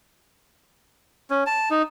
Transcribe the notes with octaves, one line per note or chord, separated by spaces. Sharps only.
C#4
A5
D#4